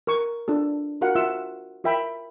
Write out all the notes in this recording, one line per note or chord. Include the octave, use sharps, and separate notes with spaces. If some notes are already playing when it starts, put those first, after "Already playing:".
A#4 C#6
D4 F4 A4
F4 F#4 A#4 F5 F#5
F4 E5 F#5 E6
F4 A#4 E5 G5 B5